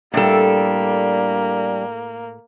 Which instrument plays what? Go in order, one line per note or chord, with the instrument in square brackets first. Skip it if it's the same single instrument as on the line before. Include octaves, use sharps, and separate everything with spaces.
[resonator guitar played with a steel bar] A2 A4 [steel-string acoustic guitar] G3 D4 [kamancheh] A#3